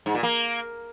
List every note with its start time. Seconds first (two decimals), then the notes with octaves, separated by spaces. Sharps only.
0.06 G#2
0.15 A#2
0.23 A#3